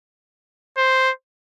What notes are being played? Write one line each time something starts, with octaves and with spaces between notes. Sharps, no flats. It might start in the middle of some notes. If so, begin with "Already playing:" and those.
C5